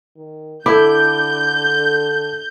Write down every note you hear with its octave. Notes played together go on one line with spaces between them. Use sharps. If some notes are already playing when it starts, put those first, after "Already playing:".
D#3
D3 E4 A4 D6 G6